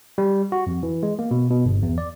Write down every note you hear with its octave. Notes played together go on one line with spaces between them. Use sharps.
G3
F#4
F2
E3
G#3
A#3
B2
B2
G1
E2
D5